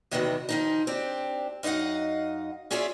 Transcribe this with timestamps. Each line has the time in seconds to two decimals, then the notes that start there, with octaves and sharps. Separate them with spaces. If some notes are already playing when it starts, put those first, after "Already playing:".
0.11 E2 C3 D#3 E3 F#3 B3
0.49 D#3 F3 D#4
0.87 C4 D4 G4
1.63 F#2 D#4 D#5 F5 F#5
2.71 C#4 F4 G#4 C#5 D5 E5